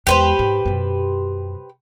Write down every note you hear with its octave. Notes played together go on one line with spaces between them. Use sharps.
E2 G#3 G4 B4 C5
G#2
F#2 B2